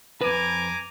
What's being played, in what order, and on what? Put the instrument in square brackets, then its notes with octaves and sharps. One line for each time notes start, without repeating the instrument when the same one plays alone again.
[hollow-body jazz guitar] F2 B4 [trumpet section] G#5 A#5 D6